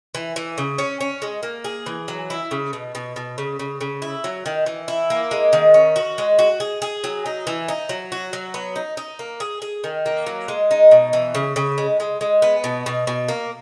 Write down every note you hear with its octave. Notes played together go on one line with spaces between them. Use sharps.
E3
E3
C#3
C#4
C#4
G#3
A#3
G#4
E3
F#3
E4
C#3
B2
B2
B2
C#3
C#3
C#3
E4
F#3
D#3
E3
E4
A#3
G#3
D#3
C#4
F#4
G#3
F#4
G#4
G#4
F#3
D#4
E3
D#4
F#3
F#4
F#3
B3
D#4
D#4
A#3
G#4
G#4
D#3
A#3
F#3
G#3
D#4
B2
E3
C#3
C#3
G#3
G#3
G#3
B3
B2
B2
B2
A#3